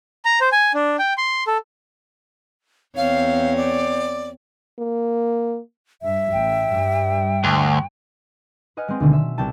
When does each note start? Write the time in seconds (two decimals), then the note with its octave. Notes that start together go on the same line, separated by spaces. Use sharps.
0.25 A#5
0.41 C5
0.52 G#5
0.74 D4
0.99 G5
1.18 C6
1.47 A4
2.97 E2 C4 C#5 F5
3.57 D5
4.79 A#3
6.02 G2 E5
6.32 A1 G5
6.70 G2 G3
7.44 D2
8.77 B4 D#5 F#5 G#5 F6
8.88 G#3 C4
9.00 D2 B2 D3 D#3
9.13 E5
9.38 C2 G5 A5